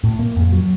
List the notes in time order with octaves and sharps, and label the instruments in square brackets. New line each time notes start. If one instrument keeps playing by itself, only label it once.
[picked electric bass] A2
A#3
F2
F#3